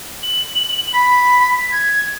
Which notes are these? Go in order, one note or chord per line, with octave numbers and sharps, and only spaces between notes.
F#7
B5 B6
G#6